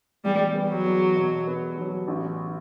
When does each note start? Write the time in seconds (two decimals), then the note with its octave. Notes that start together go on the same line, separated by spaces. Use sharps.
0.24 E2 G3
0.55 B3
0.70 F#3
0.86 E2
1.16 B2
1.47 B3
1.78 F#3
2.08 A1